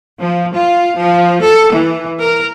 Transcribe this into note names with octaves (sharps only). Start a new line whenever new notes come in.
F3
F4
F3
A4
E3
A#4